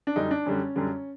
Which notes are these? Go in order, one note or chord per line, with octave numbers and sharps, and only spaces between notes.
D4
F#2 D3 G3 D#4
D4
F#2 D3 G3 C#4
F#2 D3 G3